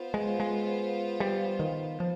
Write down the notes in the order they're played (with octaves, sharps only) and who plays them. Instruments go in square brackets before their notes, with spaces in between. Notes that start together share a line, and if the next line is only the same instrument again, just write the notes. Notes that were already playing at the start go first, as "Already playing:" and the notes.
Already playing: [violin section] B3 F4 C5
[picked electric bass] G#3
G#3
G3
D#3
F3